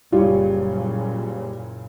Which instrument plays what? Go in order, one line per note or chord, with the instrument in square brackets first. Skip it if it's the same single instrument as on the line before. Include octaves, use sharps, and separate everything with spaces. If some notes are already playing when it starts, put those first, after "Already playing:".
[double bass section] F#1 A#2 C#3 [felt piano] G3 [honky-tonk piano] F4 C#5